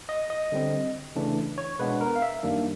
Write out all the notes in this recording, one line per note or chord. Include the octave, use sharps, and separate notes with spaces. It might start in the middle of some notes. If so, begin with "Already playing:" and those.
D#5
D#5
D3 G3 C4
C#3 E3 A3 D4
C#5
B2 G#3 B3 D4 B4
A#4
F5
E5
F#2 D#3 G3 A#3 D4